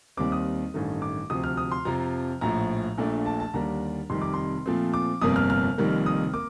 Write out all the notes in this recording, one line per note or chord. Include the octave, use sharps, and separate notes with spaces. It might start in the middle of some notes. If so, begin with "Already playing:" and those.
D#2 D#3 G3 C4 D6
D#6
A1 G2 D#3 A3
D6
D2 C3 F3 D#6
F6
D#6
C6
F2 C3 F3 A#5
A#1 A2 F3 A#5
A#1 A#2 A3 D4
A5
A5
D#2 D3 G3 A#3 D4 A#5
F1 F2 C3 D#3 G3 C6
D6
C6
A#2 F3 A3 C4
D6
G1 F2 C3 G3 A#3 D#6
F6
F6
F1 F2 D#3 G3 A#3
D#6
A#3 D6